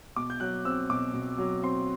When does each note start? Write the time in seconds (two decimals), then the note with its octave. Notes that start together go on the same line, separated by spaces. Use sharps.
0.16 B2 D6
0.30 G6
0.40 F#3 F#6
0.65 C4 E6
0.90 B2 D6
1.13 B2
1.38 F#3
1.63 C4 C6